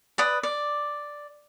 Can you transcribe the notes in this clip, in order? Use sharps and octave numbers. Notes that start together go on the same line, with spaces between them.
B4 D5 D#6
D5